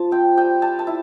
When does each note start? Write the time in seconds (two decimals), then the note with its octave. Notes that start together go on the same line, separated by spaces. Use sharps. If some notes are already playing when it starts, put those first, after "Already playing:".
Already playing: F3 F4 A5
0.11 C4 G5
0.37 G3 G5
0.62 G3 A5
0.79 A5
0.87 E4